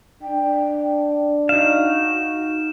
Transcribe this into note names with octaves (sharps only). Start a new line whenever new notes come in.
D4 G5
D#4 F#4 F5 E7